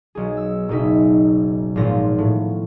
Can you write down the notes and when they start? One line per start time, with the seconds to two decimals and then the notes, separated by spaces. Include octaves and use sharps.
0.15 B1 G#4
0.37 E6
0.69 F#1 B2 D#4 E5
1.76 G#1 A#2 F3 B3 F4 A#6
2.18 A2